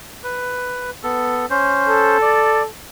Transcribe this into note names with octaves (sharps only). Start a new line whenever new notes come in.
B4
B3 A4
C#4 C5
A4
D5